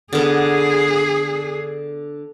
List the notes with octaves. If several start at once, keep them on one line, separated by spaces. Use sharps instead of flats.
D3 B3 G#4